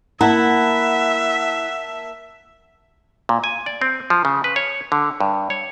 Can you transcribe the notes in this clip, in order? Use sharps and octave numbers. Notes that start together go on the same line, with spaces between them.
A#3 E4 E5 F#5 A5 A#5
A#2
G#5
D5
C4
F3
C#3
B4
C#5
D3
G2
C#5